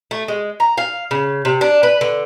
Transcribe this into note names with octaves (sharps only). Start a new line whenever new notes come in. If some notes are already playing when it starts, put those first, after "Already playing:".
A3
G#3
A#5
F5
C#3
C3
D4
B4
D3